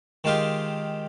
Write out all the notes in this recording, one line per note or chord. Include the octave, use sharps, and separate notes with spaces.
D#3 G#3 F4 G4